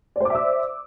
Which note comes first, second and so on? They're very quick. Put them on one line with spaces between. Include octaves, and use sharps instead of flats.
D5 C5 D6 E5 E6